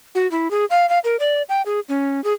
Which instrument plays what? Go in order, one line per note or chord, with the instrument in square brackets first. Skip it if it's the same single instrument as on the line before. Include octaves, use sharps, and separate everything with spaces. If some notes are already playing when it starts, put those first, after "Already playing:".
[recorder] F#4
E4
G#4
F5
F5
A#4
D5
G5
G#4
C#4
G#4